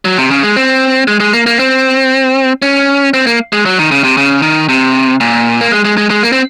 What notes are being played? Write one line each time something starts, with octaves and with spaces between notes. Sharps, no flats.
F#3
C3
C#3
G#3
C4
G#3
G#3
A#3
A#3
C4
C#4
C4
A#3
G#3
F#3
D#3
C#3
C3
C#3
D#3
C3
A#2
A#3
G#3
G#3
G#3
G#3
A#3
C4